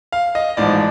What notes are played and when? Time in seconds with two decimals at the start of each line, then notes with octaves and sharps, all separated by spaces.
0.12 F5
0.35 D#5
0.57 A1 G#2 F3 D5